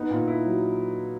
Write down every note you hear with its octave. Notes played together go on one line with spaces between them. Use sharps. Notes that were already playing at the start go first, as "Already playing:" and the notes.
Already playing: B3 D#4
A#2
E4
F#3